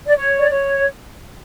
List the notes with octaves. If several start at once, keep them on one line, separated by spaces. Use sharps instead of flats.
D5
C#5
D5
C#5